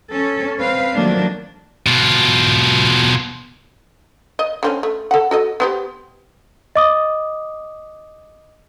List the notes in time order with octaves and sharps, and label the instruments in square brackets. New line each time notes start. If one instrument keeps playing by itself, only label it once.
[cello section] C#4 A4
C4 B4 F5
D#3 F3 F#3 A3 A#3 D4
[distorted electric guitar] B2 F4
[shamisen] D#5
D3 C4 C#4
A3
A4 F#5
F#4 A4 D#5
B3 C4 G4
[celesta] D#5 D6 D#6